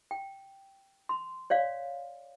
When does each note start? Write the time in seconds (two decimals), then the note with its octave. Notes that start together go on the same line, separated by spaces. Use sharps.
0.11 G5
1.09 C6
1.50 C#5 D5 F5